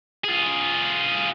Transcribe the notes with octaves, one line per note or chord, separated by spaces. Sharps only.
F4 G#4